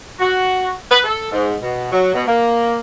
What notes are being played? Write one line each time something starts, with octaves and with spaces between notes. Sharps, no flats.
F#4
B4
A4
G#2
B2
F#3
B2
A#3